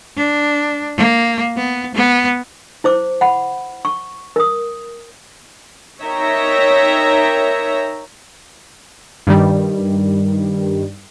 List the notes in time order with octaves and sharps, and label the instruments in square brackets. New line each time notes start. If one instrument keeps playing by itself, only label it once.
[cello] D4
A#3
B3
B3
[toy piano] E4 C5 D6
F#5 B5
C#6
A#4 D#6
[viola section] D#4 A#4 C#5 E5 G5 A#5
[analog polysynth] G2 D#3 G3